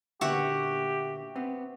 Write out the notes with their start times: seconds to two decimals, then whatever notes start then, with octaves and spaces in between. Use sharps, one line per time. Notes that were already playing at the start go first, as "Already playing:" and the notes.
0.21 A#2 D3 B3 F#4 G4 E5 F#5
1.36 B3 C4